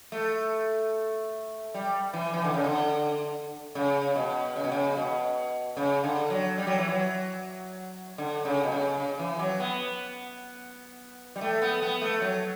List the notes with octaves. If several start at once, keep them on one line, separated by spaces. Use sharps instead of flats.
A3
G3
E3
E3
D3
C#3
D3
C#3
B2
C#3
B2
C#3
B2
C#3
D3
F#3
G3
F#3
E3
F#3
D3
C#3
B2
C#3
C#3
E3
F#3
B3
G3
A3
B3
B3
A3
F#3